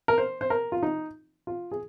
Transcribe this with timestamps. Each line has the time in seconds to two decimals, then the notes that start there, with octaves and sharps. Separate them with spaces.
0.08 A#4
0.18 C5
0.41 C5
0.50 A#4
0.72 F4
0.83 D#4
1.47 F4
1.71 G#4